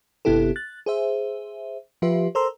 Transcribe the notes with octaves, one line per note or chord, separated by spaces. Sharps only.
G1 C3 B3 E4 G4 A4
F#6 A6
G#4 C5 E5
F3 F4 G4 B4 E5
A4 A#4 C5 A#5 C6 E6